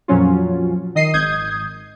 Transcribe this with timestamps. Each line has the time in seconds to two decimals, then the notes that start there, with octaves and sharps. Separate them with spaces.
0.08 F2 A#2 F3 F#3 C#4 F4
0.95 D#3 D#5 C7 D#7
1.13 G#1 D#6 G6 G#6